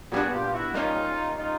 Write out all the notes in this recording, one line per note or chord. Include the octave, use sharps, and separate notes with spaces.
A#2 G3 B3 D4 F#4 G#4
F4 G4
F4
E4 F#4
G3 A#3 C#4 D#4 F4
D#4 F4